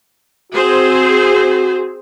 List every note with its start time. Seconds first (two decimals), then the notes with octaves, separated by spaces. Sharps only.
0.52 C4 F#4 G#4 C5